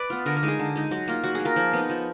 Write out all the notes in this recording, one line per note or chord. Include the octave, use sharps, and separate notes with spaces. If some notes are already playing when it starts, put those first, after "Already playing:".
Already playing: B4 D5
B3 F4
D3 A#4
A#4
G#3 D#4
G#4
D3
G#3 D#4
F#3
A#3 F4
F#3 F#4
A#3 G#4
F4 A#4
F3
B3 D#4
F3